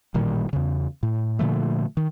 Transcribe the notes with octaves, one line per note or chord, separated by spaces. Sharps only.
A1 A#2 D#3 G3
E2 C#3
A2
A#2 D3 F3 A3
D#3